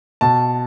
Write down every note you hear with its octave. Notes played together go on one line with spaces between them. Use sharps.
B2 A5